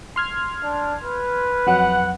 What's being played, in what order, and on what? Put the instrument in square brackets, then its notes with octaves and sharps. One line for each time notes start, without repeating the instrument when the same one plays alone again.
[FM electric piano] C6 F6 G#6
[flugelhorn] D4
B4
[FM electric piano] F2 F#3 [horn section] F#5